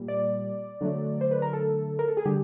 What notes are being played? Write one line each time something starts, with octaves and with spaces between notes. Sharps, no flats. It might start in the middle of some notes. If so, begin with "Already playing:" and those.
Already playing: A#2 G3
D5
D3 F#3 A3
C5
B4
A#4
A4
A#4
A4
G#4
D3 G3 G4